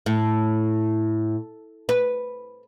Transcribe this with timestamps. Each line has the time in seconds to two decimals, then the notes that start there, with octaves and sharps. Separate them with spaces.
0.06 A2
1.89 B4